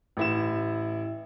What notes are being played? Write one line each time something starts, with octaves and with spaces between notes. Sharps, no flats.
A1 E4 E7